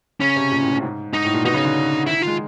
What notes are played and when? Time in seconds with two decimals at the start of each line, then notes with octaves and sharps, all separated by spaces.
0.20 C#3 C#4
0.36 C3
0.51 A#2
0.62 A2
0.73 A2
0.83 G#2
1.13 G#2 D#4
1.25 A2
1.34 A#2
1.45 B2 D#4
1.54 C#3
1.65 D3
2.06 D#3 E4
2.17 D#3
2.22 G#3 F4